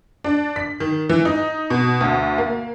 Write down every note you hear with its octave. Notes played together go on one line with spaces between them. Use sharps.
D4
B6
D#3
E3
D#4
B2
D2
A#3